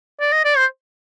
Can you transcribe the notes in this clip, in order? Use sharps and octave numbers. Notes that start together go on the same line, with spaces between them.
D5
D#5
D5
C5